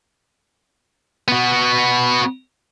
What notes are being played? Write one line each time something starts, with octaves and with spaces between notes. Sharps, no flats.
B3 F#4